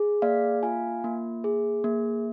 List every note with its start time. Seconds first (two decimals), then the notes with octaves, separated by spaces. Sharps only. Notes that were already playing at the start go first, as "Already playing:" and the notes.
Already playing: G#4
0.22 A#3 D5 F5
0.63 F4 F5 G#5
1.04 A#3
1.44 G#4
1.84 A#3